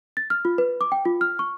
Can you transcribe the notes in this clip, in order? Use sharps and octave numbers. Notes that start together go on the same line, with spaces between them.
A6
F6
F4
B4
D6
G5
F4
F6
C#6